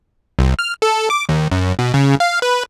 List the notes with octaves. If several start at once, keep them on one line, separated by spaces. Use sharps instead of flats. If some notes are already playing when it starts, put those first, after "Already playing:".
C2
F6
A4
D6
D#2
F#2
B2
C#3
F5
B4